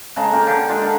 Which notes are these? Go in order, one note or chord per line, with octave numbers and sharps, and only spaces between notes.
C#3 G#3 A4 A#5
A#3 C#4 F4 G5
D3 A#3 G4
G#3 D4 F4
D3 A#4